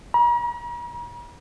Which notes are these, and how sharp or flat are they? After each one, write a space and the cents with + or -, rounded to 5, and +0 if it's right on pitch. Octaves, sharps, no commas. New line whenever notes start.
A#5 +45